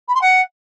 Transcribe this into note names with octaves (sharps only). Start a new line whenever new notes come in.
B5
C6
F#5